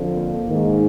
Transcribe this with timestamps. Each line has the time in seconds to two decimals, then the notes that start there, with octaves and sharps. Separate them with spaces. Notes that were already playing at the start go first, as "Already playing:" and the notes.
Already playing: F2 D3 F3
0.15 A#3
0.48 G#2 D#3